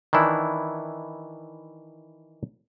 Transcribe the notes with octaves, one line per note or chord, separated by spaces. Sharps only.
D#3 E3 D4 E4